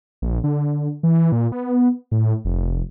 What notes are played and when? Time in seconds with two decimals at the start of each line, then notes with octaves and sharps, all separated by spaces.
0.22 A#1
0.44 D3
1.03 E3
1.32 A#2
1.52 B3
2.11 A2
2.45 F1